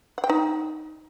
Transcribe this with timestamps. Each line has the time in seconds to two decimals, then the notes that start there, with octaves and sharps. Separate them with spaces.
0.18 F#5
0.24 G5
0.29 D#4